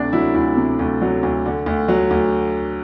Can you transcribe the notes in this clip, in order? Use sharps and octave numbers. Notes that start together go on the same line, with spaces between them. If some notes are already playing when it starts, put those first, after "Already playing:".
Already playing: D2 C3 D4
F#3 E4
D2 E4
C3
D2
F#3
D2
D3
D2
F#3
D2